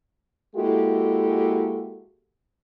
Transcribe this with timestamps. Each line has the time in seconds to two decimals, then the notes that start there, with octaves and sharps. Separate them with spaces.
0.56 G#3 A#3 E4 F#4 G4 A4